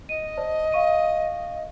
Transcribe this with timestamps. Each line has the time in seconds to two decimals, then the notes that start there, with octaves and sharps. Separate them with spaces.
0.09 D#5 D#7
0.37 C5 D5 A5
0.72 F5 C#6 D#7